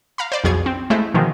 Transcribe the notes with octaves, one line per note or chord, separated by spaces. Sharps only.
F5 A#5 B5
C5 D5
B1 F2 B2 G#4 C#5 G#6
C4
G#3 A3 E4 C5 E5
B2 D3 D#3 F3 G#3 C4